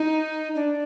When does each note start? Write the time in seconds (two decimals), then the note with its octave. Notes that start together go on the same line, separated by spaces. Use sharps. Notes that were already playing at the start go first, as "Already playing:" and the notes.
Already playing: D#4
0.56 D4